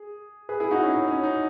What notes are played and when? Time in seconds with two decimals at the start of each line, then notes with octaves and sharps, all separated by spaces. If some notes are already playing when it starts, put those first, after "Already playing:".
Already playing: G#4
0.49 G#4 B4
0.60 E4 G#4
0.71 D#4 F#4
0.83 C#4 E4
0.94 D#4
1.08 C#4
1.23 D#4